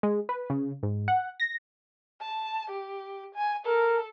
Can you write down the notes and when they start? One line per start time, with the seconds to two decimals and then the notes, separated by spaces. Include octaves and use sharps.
0.03 G#3
0.29 B4
0.50 C#3
0.83 G#2
1.08 F#5
1.40 A#6
2.21 A5
2.70 G4
3.35 G#5
3.66 A4 A#4